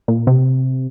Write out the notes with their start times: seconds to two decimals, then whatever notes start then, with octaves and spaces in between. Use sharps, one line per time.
0.08 A#2
0.27 C3